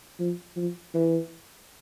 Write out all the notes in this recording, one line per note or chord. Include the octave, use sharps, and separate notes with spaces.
F3
F3
E3